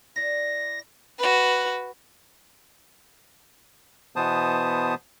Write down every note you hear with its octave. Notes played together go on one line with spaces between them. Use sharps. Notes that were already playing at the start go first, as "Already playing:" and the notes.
E4 D5 A#6
F#4 B4
B2 E3 B3 C5 A5 D#6